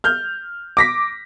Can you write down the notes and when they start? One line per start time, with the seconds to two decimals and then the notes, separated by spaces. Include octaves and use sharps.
0.04 F6 G6
0.77 D6 A#6 B6